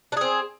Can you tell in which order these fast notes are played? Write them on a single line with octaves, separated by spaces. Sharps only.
D4 G#4 C4